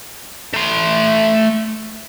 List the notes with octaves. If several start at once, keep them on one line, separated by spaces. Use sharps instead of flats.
A3 C6